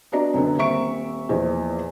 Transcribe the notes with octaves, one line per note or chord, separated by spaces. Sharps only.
B3 D4 F#4 D5 D#5 A#5
F#2 D3 B3
D#1 A#3 C4 E5 C#6 D7
E2 A#2 F3 D#5